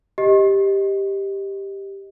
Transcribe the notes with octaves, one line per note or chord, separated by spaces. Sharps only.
G4 D#5